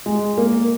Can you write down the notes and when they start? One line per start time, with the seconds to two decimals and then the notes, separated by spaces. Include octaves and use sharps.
0.06 G#3
0.38 A#3